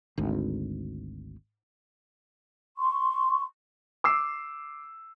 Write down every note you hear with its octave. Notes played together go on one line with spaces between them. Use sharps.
G#1 D2
C6 C#6
D6 E6 C7